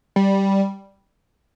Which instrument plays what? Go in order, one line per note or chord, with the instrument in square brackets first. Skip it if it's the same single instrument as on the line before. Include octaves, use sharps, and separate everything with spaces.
[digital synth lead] G3